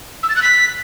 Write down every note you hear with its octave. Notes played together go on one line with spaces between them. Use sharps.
E6
A6
F#6
B6